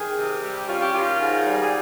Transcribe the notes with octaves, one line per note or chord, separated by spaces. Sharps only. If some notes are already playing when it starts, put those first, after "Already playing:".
Already playing: D#3 G#4
C3
G3 G4
C#4 F4
G4
D#3 F4
G#2
G3
G#4